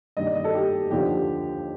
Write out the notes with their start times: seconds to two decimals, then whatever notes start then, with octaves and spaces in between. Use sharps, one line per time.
0.17 G2 D#3 D#5
0.26 D5
0.35 D#5
0.44 A4
0.54 G4
0.91 D#2 D3 F3 G4